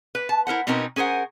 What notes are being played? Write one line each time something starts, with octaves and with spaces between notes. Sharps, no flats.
B4
A5
E4 A#4 C5 F#5
B2 C4 C#4 D#4 A#4 B4
C#4 G#4 A#4 C5 F#5